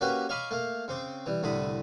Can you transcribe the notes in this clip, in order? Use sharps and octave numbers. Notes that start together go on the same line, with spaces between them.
A#3 C#4 F#4 G4 B4
C#5 D#5 F5 G#5 B5 D6
A3 A#3 F5
C#3 C4 D6
E3 G3
C2 A2 D3 B5 D#6